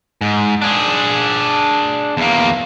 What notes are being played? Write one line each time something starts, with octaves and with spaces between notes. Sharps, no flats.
G#2
D4 G#4
E2 A#3